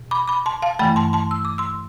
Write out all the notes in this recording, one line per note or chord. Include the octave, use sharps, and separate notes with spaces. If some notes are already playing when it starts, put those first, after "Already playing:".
Already playing: B2
B5 D6
B5 D6
A5 C6
F5 A5
G2 E3 A3 G5 B5
A5 C6
A5 C6
E6
D6
C6 E6